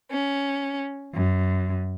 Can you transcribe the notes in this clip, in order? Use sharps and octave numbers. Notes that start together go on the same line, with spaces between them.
C#4
F#2